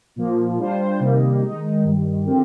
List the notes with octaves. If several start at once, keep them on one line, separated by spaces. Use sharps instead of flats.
A#2 F3 A#3
G3 D4 F4 C5
C3 D#3 G3 A#3 D#4
D#3 G#3 D#4
G2 D#3 G3
D3 F3 C4 G4 A#4